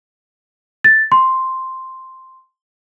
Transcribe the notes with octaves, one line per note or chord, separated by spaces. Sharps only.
A6
C6